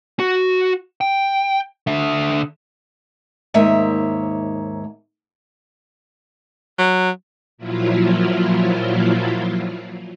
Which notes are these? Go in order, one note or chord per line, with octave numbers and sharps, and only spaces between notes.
F#4
G5
D3 E5
D#2 G#2 A#3 C#5 E5
F#3
A#2 F3 F#3 E4 F4